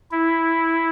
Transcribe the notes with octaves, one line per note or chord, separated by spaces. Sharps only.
E4